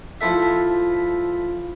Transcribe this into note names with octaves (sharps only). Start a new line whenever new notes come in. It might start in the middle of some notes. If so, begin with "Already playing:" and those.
F3 E4 A4 E5